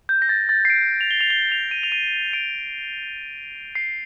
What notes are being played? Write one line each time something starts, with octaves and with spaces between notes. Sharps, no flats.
G6
A#6
A6
A6
C7
D7
F7
G7
F7
G7
F7
D#7
F7
D#7
D7
C7